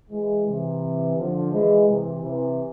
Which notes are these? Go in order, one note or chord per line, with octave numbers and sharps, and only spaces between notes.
E3 G#3
C3 E3
D3 F3
E3 G#3
C3 E3
C3 E3